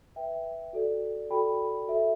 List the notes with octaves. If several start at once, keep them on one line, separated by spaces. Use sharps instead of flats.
B4 E5 G5
F#4 A4 D5
F#4 A4 D5 G5 B5
F#4 A4 E5